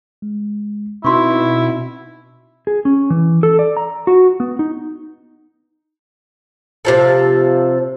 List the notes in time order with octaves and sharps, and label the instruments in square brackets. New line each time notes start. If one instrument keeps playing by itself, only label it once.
[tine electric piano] G#3
[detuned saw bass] B2 [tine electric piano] C4 D#4 F#4 [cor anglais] E4 [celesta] C6 C#6
[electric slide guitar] G#4
C#4
E3
A4
D5
A#5
F#4
B3
D#4
[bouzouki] C3 F3 A4